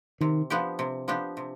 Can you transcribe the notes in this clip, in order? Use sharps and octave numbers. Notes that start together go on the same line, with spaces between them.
C3 D#3
F3 B3 D4 G4
C3
F3 B3 D4 G4
C3